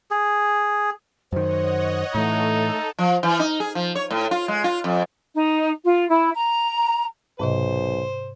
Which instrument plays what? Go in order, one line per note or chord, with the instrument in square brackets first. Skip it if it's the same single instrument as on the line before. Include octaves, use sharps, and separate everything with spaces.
[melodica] G#4
[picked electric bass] F#2 D#3 [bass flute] C5 [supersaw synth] C#5 D#5 F#5
[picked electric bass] A2 E3 [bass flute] A3 [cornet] D#4 [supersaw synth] A4
[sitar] F3
E3
D#4
G#4
F3
C#5
A2
F4
G#3
F4
F2
[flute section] D#4
F4
E4
A#5
[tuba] B1 [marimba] G#2 C3 D#5 [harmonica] C5